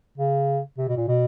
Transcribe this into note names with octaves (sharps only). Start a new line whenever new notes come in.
C#3
C3
B2
A#2
B2